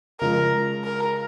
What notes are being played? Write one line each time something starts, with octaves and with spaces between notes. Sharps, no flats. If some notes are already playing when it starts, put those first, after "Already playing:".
C#3 F3 G#3 A#4
A#4